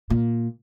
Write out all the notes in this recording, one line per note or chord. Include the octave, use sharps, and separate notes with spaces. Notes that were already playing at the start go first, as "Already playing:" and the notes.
A#2